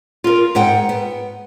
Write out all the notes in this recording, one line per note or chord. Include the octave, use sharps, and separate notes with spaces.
F4 A#4
G#2 F#5 G5
B3